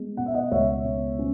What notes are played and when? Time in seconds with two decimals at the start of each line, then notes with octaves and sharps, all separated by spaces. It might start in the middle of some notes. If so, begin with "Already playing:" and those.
Already playing: G#3 B3
0.17 B2 F#5
0.26 E5
0.34 D#5 F#5
0.51 C#2 C#5 E5
0.85 B2
1.19 C#4